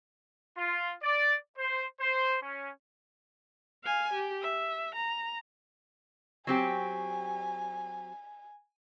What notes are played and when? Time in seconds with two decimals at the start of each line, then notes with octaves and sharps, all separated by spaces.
0.57 F4
1.02 D5
1.57 C5
2.00 C5
2.42 C#4
3.84 F5 G#5
4.13 G4
4.42 E5
4.95 A#5
6.47 F#3 C4 G4 G#5